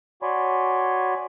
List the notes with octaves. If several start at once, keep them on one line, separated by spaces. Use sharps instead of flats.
F#4 C#5 D5 G#5 B5 C6